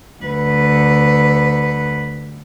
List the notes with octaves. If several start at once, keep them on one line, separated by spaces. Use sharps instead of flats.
D2 B4